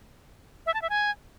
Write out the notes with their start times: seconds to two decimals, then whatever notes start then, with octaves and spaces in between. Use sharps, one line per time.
0.66 E5
0.74 A5
0.82 E5
0.89 G#5